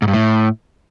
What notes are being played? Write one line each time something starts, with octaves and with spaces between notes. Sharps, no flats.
G#2
G2
A2